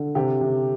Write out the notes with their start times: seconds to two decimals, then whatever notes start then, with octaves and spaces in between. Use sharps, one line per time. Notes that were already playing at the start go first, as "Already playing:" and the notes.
Already playing: D3
0.15 C3 G4
0.41 C3